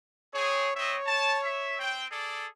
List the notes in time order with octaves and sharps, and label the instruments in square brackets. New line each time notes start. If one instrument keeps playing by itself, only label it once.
[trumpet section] C4 G#4 [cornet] C#5
[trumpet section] C4 D#5 E5 [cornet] C#5
[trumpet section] A5
E5
C4 G5
G#4 A4 D5